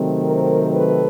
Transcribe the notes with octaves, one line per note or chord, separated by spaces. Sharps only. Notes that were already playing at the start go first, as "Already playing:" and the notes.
Already playing: C3 D#3 F#3 A3 C4
A#4 C5
A4 B4